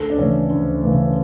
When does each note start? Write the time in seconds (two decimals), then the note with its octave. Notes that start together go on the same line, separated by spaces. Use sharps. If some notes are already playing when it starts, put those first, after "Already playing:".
Already playing: D2 A4
0.10 D4
0.18 C#3 E3 A3 C#4
0.50 D2
0.83 C#3 E3 A3